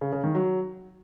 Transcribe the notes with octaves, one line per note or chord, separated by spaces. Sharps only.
C#3
C#3
D#3
F#3